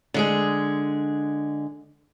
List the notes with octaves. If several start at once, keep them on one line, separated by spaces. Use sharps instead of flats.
D3 G#3 G#4